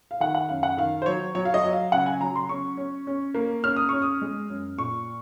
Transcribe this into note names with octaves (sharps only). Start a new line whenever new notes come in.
F5
D#3 F#5
F#5
F#2 F5
F#5
D#3 F5
C5
F#3 C#5
F#3 C#5
F5
D#5
F#3
F5
C#3 F#5
G#5
F#3 A#5
C6
C#4 C#6
C#4
C#4
A#3
C#4 F6
D#6
C#4 C#6
D#6
G#3
F#2
A#2 C#6